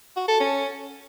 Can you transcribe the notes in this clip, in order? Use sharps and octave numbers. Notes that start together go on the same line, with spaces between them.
F#4
A4
C#4